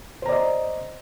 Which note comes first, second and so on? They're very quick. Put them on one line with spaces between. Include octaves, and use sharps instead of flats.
C5 A#5 D5 D#5